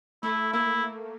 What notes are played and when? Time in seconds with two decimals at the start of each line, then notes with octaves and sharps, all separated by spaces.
0.23 A3 E4
0.53 A#3 E4